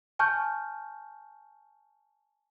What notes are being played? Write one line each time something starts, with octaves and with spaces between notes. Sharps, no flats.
G#5 A5 C#6 F6 G6